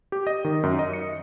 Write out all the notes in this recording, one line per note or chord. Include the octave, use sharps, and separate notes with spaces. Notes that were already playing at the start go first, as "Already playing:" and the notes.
G4
D#5
D#3
F#2
D#5
C#7